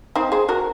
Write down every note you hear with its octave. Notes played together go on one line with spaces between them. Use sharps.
C4 D#4
G#4 C5
F#4 A#4